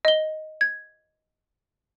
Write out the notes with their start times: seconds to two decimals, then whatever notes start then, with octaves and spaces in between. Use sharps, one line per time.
0.05 D#5 G7
0.61 G#6